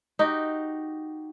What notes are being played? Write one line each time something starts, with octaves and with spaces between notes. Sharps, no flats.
D#4 F#4 G4